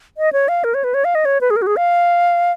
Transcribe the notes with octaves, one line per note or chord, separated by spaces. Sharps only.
D#5
C#5
F5
A#4
C#5
B4
C#5
F5
D#5
C#5
B4
G#4
A#4
F#4
G#4
F5